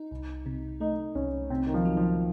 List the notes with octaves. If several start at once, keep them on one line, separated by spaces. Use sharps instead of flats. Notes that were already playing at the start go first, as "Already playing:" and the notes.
Already playing: D#4
C2
C3
A3 D#4
C2 C#4
C3 C4
D#3
F3
F#3
F3